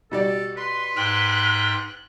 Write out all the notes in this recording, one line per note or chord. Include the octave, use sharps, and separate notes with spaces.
B2 G3 A4 D5
B4 C6
G#2 G5 C6 F#6